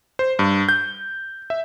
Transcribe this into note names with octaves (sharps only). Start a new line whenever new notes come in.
C5
G2
G6
E5